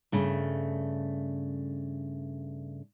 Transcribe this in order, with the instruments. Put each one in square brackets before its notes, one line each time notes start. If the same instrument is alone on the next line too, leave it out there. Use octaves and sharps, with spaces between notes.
[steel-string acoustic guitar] G2 C#3 A3